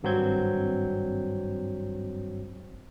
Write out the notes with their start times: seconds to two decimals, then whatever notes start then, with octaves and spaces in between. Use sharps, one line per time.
0.03 G#1 G2 F#3 C4 G6 G#6